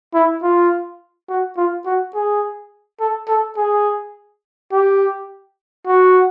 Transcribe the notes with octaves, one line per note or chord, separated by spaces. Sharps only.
E4
F4
F#4
F4
F#4
G#4
A4
A4
G#4
G4
F#4